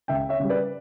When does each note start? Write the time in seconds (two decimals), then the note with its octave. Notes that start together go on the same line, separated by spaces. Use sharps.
0.08 C#2 E5 G5
0.29 C#5 E5
0.40 C#3 G3
0.50 B4 D5